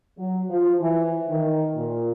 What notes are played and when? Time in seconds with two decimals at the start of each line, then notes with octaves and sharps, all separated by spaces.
0.18 F#3
0.50 F3
0.80 E3
1.29 D#3
1.76 A#2